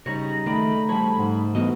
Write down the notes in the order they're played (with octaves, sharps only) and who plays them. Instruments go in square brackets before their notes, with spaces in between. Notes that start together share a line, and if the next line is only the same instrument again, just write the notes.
[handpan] C#3 [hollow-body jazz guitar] G3 C#5 [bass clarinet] D#4 [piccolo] A#6
[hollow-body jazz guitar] D#3 D5 [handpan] A3 [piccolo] B5
[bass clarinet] F3 [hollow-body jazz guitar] G3 C#5
[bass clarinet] G#2
[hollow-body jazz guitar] G2 F#4 D#5 [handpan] E3 B3